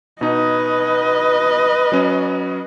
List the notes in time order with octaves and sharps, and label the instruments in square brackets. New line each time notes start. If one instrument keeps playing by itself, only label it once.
[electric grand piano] B2 D#4 [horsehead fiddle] B4 D#5
[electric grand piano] F#3 C#4